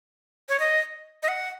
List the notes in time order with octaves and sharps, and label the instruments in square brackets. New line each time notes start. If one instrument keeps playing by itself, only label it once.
[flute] C#5
D#5
D#5
F#5